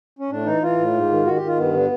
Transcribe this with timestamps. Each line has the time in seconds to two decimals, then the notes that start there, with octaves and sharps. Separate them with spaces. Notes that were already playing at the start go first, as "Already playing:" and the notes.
0.19 C#4
0.30 A2 D4
0.45 E3 D#4
0.62 E3 F4
0.78 A2
0.94 G#2
1.10 D#3
1.26 D#3 F#4
1.36 G4
1.42 D#3 F4
1.57 G2 B3
1.74 D3